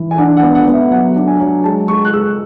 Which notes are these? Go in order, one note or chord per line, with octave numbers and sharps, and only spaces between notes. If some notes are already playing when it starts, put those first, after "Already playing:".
Already playing: E3
G#5
D4 F#5
F#5
B3
F#5
B3
E5
F#3 F#5
D4
G#5
F#3
G#3 A5
G#3 C#6
F#6
G#3 E6